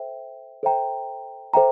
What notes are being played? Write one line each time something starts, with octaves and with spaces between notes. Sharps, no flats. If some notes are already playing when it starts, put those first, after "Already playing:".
Already playing: A4 C5 E5 G5
A4 C5 E5 G5 A#5
A4 C5 E5 G5 A#5